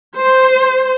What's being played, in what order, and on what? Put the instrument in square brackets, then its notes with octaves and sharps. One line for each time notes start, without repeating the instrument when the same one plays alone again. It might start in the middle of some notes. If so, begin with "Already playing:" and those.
[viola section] C5